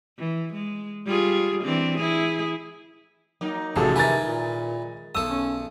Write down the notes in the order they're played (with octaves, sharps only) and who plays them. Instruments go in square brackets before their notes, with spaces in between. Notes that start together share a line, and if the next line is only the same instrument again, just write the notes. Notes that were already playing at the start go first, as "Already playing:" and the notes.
[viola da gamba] E3
G#3
G3 F4 G#4
E3 C4 D4
E4 G#4
[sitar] F#3 A#3 D#4
[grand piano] A1 G#4 A5 [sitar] E2 A4 [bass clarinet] C3 [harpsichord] F#3
[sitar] D#3 G#3 [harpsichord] E4 A#4 B4 [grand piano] G#5 A#5 A6
[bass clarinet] A#2
[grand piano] B1 E6 [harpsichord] A4 D#6
[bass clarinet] C#4